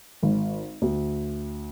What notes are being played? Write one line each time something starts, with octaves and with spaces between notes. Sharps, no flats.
G#1
D2